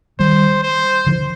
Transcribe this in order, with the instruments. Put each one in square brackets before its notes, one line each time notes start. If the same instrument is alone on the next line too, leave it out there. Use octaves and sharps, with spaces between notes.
[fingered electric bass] D#3 G3 [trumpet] C5
[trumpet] C5
[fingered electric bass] D3 F3